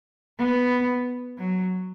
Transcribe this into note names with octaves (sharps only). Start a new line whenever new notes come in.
B3
F#3